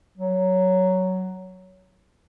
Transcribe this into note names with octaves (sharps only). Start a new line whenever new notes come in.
F#3